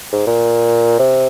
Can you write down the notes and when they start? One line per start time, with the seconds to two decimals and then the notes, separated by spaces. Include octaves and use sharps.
0.12 G#2
0.27 A#2
0.99 C3